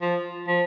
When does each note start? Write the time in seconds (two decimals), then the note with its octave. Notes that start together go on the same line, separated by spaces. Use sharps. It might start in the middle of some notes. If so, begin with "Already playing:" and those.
0.02 F3
0.48 F3